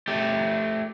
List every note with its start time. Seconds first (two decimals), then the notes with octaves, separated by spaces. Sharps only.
0.08 A3 G4